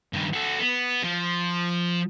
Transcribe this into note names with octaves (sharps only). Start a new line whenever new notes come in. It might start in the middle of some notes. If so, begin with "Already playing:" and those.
G2 D#3
F#4 A4
B3
F3